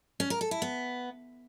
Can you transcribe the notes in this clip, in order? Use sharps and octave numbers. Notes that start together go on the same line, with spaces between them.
C#4
A#4
A4
E4
B3